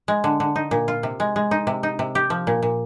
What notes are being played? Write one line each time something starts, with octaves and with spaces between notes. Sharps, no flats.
G#3
D3
D3
D#4
A#2
F4
C3
G#3
G#3
D#4
C3
D#4
C3
G4
F3
A#2
A#2